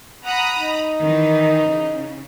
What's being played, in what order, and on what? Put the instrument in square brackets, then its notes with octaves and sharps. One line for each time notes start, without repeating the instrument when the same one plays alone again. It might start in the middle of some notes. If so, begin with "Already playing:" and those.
[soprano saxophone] F#5 [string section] A#5 B5 D#6
[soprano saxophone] D#4
[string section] D#3 E3
C#3